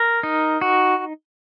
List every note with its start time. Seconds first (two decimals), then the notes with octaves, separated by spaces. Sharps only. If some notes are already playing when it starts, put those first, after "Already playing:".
Already playing: A#4
0.23 D#4
0.61 F#4